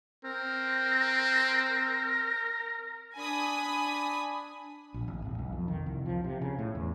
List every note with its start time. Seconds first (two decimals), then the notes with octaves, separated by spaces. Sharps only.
0.25 C4 A#4
3.17 D4 G#5 B5 D#6
4.94 A#1
5.08 G#1
5.25 D#1
5.38 B1
5.52 F2
5.68 D#3
5.86 C2
6.06 F3
6.24 C3
6.42 C#3
6.59 A2
6.75 E2